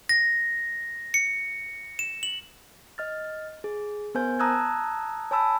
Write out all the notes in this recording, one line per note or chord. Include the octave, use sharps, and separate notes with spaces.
A#6
C#7
E7
F#7
D#5 F6 A6
G#4
B3 A#4 C5 G#5 G6
A5 A#5 D#6 E6 F#6 G#6
C#5 G#5 A5 B5 E6